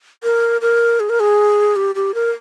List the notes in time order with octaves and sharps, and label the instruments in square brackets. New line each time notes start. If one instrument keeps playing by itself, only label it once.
[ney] A#4
A#4
G#4
A#4
G#4
G4
G4
A#4